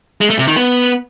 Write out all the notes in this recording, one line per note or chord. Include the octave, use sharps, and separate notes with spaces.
G#3
A3
C3
D#3
B3